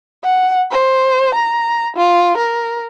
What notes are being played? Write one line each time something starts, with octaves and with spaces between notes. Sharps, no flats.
F#5
C5
A#5
F4
A#4